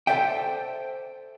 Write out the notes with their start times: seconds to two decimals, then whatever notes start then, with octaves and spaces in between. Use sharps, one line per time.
0.07 A4 C5 D5 E5 G5